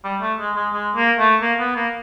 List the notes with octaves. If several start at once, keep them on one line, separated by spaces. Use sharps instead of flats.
G3
A3
G#3
G#3
G#3
A#3
A3
A#3
B3
A#3